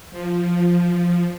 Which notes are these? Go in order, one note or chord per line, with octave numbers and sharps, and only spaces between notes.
F3